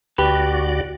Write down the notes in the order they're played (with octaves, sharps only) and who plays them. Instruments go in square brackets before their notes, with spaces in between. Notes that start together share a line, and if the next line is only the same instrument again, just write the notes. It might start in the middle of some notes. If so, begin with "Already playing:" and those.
[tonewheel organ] D2 F#4 D5 [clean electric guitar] G4 B4